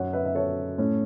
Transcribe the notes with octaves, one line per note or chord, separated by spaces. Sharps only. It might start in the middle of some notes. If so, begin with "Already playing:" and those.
Already playing: F#2 F#3 C#4 C#5 F#5
B4 E5
E5
A4 C#5
A2 A3 C#4